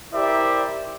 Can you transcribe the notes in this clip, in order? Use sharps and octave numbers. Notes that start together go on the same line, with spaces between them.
E4 G4 A#4 C5 D5 E5